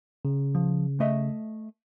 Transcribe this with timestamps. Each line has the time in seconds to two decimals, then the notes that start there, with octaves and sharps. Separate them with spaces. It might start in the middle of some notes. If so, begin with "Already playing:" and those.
0.25 C#3
0.55 F3
1.00 A3 D#5 E5